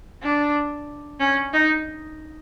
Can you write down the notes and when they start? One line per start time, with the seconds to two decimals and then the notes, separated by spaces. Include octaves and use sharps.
0.22 D4
1.20 C#4
1.53 D#4